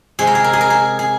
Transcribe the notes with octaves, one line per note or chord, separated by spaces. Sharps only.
C3 G#3 C4 G#4
A#4
G#4
A#4
G#4
A#4
G#4
G#4